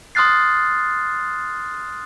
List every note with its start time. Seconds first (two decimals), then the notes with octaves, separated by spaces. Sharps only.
0.15 C6 D#6 F6 F#6 A6 C7